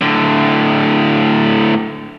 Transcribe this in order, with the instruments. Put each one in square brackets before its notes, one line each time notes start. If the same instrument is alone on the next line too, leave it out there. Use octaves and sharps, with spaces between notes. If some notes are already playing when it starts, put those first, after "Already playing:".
[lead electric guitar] A2 D3